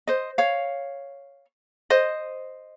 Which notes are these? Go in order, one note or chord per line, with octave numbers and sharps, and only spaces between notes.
C5 D#5
C#5 F5
C5 D#5